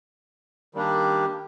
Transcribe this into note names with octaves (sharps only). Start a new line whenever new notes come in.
D#3 G3 A#3 D4 G4